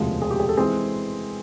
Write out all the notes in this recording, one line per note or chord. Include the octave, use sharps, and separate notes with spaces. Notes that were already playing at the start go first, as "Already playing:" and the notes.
Already playing: E1 D2 C3 F3 G#3
G#4
G4
G#4
A4
E3 G#3 C4 G#4